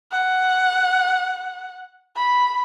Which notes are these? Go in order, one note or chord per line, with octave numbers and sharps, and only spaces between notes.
F#5
B5